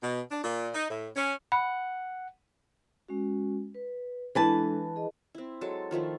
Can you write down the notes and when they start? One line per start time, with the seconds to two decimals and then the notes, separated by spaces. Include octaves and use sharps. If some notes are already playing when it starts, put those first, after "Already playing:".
0.03 B2
0.31 D4
0.44 A#2
0.74 D#4
0.90 A2
1.16 C#4
1.52 F#5 B5
3.08 G#3 C#4 F#4
3.74 B4
4.35 E3 G#3 D4 A4 B4 A5
4.96 G#4 D#5
5.35 C4 E4
5.61 F#3 G#3 A4 A5
5.91 D#3 F3 A3 E4